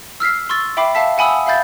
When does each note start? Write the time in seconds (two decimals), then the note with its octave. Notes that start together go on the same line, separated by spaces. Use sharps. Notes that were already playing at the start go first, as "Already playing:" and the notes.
0.20 E6 F6 B6 C7
0.49 C6 C#6 E6 A6
0.77 E5 G5 B5 D6 C7
0.95 E5 F5 A5 E6 B6
1.18 F#5 G#5 B5 D#6 E6
1.46 E5 F5 B5 G6 A6